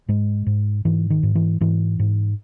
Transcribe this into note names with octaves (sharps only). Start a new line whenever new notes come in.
G#2 G#3
G#2
G#2 E3
D#3
G#2
E3
G#2 E3
G#2